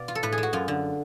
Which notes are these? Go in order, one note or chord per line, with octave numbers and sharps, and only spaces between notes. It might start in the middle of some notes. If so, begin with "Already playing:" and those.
Already playing: B2 D5 F5
F4
A4
A2 B4
G#4
G#3
F#4
F#2 F4
D3